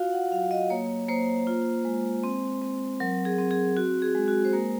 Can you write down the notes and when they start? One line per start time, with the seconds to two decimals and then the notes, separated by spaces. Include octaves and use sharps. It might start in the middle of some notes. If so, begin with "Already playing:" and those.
Already playing: F4 F#4 F5
0.12 F#5
0.32 F#3 F5
0.51 D#5
0.70 A#3 C#5
1.09 A#3 C5
1.47 F4
1.85 G#3
2.23 C4
2.62 C4
3.00 F#3 A#4
3.25 G#4
3.38 C4
3.51 G#4
3.77 F#4
4.02 G#4
4.15 G#3
4.28 F#4
4.45 C5
4.53 A#3 A#4